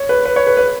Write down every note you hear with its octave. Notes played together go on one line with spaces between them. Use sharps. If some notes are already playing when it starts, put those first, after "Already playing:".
Already playing: C#5
B4
B4
C#5
B4
B4